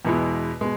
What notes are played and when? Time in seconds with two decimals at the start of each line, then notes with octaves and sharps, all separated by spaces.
0.05 E2 B2 G#3 B3 E4
0.61 B2 G#3